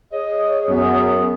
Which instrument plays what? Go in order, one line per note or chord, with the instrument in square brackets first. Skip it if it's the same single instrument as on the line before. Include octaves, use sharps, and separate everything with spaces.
[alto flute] G#4 [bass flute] C#5 [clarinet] D#5
[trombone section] F#2 [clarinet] B3